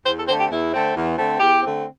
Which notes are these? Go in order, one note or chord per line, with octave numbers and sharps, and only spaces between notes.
E2 C5
A4
D3 A3 C4 C5
G4
E2 E4
D3 A3 C4
E2
D3 A3 C4
E2 G4
D3 A3 C4